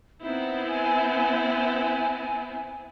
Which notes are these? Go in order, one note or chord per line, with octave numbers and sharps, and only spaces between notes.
B3 C4 D#4 E4
G#5